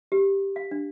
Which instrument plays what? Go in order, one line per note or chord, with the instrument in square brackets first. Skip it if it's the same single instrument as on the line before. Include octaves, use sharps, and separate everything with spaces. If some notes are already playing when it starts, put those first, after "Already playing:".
[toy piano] G4
F5
D4